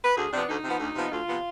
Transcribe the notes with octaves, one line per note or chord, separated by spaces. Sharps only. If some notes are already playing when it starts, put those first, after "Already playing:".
B4
D2 G#4
C3 F3 B3 D4
D2 D#4
C3 F3 B3
D2
C3 F3 B3
D2 F4
C3 F3 B3